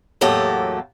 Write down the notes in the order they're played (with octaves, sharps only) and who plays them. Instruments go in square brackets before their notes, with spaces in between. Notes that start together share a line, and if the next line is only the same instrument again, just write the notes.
[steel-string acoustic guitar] E2 A2 F#3 A#3 G4 A4